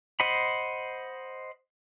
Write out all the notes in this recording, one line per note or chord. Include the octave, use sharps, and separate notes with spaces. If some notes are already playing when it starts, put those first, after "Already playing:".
C5 D#5 F#5 B5